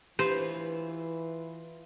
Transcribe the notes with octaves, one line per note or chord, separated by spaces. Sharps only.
E3 F4 G4 B4 C5